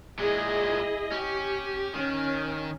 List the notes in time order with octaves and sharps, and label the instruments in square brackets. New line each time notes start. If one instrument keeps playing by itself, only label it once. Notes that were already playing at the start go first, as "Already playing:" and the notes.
[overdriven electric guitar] A#2 G#3 [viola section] E4 G#4 D#5
[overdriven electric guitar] C#4 [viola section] G4
[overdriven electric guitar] D#3 [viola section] C#4